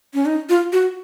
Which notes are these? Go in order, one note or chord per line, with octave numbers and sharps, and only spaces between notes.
C#4
D#4
F4
F#4